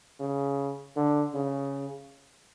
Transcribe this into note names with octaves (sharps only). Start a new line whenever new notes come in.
C#3
D3
C#3